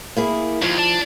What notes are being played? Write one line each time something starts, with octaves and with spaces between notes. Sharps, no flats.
A#3 E4 G#4
D#2 F3
D5 A5